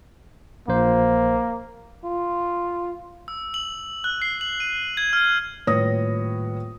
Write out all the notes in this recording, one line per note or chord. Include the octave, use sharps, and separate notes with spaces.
A#1 A#3 C5
F4
E6
F#7
F#6
C7
F#7
D#7
G#6
F6
D#1 A2 B4 C#5 D#6 A#6